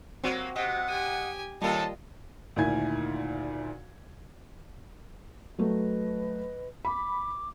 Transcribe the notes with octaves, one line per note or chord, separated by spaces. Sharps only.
F#3 A#3 C4 F#4 G4
C3 D#5 F#5
G4 G#5 D#6
D#2 G3 A#3 F4 A4 D#5 A5
D2 A#2 D#3 E4 G#5 G#6
F#3 A3 B4 D#5
B5 D6